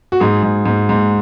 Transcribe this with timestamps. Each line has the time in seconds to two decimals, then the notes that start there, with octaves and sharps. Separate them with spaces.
0.12 F#4
0.20 G#2 G#4
0.43 G#2
0.66 G#2
0.89 G#2